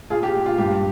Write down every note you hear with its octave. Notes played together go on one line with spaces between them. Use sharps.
A#2 F4 G#4
G4
A#2
F4
G2 G4